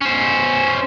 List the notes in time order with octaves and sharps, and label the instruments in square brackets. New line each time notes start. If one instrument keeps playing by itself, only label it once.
[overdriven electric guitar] C#4 C5